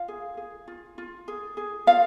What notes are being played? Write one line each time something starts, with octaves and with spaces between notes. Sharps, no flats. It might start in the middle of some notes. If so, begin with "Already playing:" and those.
Already playing: F4 F5
G#4
G#4
F4
F4
G#4
G#4
F4 F5